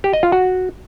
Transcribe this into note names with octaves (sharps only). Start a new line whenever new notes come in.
G4
D#5
F4
F#4